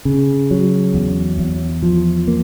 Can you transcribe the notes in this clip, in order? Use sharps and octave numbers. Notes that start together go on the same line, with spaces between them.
C#3
F#3
E2
E2
F3
A#3